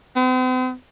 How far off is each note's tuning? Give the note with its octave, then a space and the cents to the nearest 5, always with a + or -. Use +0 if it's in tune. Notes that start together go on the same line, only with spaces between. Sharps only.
C4 -45